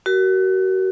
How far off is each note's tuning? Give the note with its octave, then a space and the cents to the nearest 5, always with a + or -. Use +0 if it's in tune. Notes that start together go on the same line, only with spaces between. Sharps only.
F#4 +35 A#4 +5